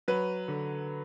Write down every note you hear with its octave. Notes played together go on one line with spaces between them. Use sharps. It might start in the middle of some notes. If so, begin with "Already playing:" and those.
F#3 B4
D3